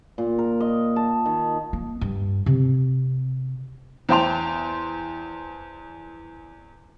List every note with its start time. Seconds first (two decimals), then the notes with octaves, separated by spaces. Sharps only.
0.18 A#2
0.38 A#4
0.60 D#5
0.96 A5
1.26 D#3
1.73 A#3
2.01 G2
2.46 C3
4.09 E2 C5 G5 A5 C6 F7